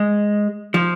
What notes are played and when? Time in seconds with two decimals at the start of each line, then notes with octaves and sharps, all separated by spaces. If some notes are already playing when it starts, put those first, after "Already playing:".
Already playing: G#3
0.74 F3